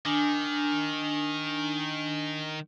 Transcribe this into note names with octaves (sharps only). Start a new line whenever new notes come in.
D#3 D4 G#5